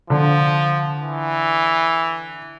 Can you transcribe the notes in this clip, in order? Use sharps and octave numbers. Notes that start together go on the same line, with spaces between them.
D3 F3
E3